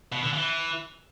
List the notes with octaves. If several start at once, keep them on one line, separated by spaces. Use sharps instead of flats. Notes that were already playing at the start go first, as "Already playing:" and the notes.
B2
D3
E3